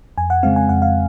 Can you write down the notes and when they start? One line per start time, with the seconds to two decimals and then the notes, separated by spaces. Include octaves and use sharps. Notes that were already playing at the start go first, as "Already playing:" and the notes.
0.18 F2 G#5
0.30 F#5
0.43 C#3 G#3 C4 F5
0.56 G#5
0.69 F2 F#5
0.82 F5